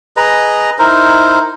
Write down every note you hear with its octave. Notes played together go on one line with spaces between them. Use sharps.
G#4 B4 D#5 A#5
D#4 E4 A#4 C5